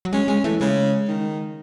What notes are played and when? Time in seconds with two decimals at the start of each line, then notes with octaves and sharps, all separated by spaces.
0.05 F#3
0.13 G#3 C#4
0.28 G#3 C#4
0.44 E3 A3
0.60 C#3 G#3
1.08 D#3